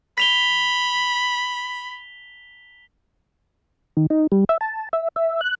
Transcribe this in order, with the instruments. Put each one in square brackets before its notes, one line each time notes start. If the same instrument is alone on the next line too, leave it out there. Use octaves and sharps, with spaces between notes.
[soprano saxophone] B5 [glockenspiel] B6 F7 G7
[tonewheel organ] D#3
D#4
G3
E5
A5
E5
E5
F#6